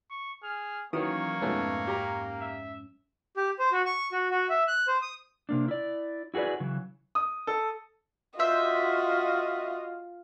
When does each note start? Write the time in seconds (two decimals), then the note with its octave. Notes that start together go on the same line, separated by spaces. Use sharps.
0.10 C#6
0.43 G#4 F6
0.93 D#3 E3 F#3 A#3 C#4 C#5 D#6
1.41 F2 G#2 B2 A3 B3 C#4
1.87 G4 A#5
2.40 E5
3.37 G4
3.59 C5
3.72 F#4
3.86 C#6
4.12 F#4
4.31 F#4
4.50 E5
4.68 F#6
4.88 C5
5.02 D#6
5.49 C3 A#3 D4
5.68 E4 D5
6.34 E4 F#4 G#4 B4 D5
6.60 C#3 E3 F#3
7.15 D#6
7.47 A4
8.39 F4 F#4 C5 D#5 E5